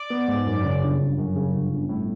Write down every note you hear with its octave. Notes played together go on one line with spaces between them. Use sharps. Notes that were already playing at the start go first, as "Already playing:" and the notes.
Already playing: D5
B3
G#2
F#2
C#3
G1
G1
F#2
C#3
G1
G1
A2